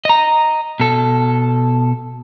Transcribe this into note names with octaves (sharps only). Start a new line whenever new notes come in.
D#5 A#5
B2 A4